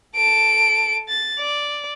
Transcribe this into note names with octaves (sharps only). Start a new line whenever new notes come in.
A4 D7
A6
D5